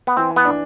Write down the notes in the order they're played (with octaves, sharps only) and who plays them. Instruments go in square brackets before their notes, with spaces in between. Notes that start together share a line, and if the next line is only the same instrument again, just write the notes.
[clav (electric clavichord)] B3
[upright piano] E3 [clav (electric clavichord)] C4
[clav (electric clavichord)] B3
[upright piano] D4